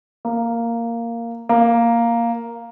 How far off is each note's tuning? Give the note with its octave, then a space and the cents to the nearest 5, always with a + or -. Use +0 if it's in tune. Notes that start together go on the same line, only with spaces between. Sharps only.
A#3 -5
A#3 +0